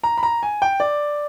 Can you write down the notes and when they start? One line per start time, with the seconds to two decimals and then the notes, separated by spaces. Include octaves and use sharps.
0.04 A#5
0.17 B5
0.23 A#5
0.43 G#5
0.62 G5
0.80 D5